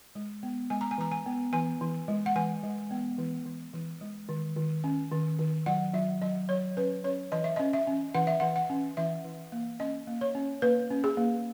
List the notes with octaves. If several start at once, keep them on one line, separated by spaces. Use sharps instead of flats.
G#3
B3
G#3 G#5
A#5
G#5
E3 A#5
G#5
B3
E3 G#5
E3
G#3
F#5
E3 G#5
G#3
B3
E3
E3
E3
G#3
D#3
D#3
C#4
D#3
D#3
F#3 F#5
F#3 E5
F#3 D#5
F#3 C#5
C#4 B4
C#4 C#5
E3 D#5
E5
D#5
C#4
E5
C#4
E3 F#5
E5
E3 F#5
F#5
C#4
E3 E5
E3
A#3
C#4 D#5
A#3
C#5
C#4
A#3 B4
C#4
G#4
A#3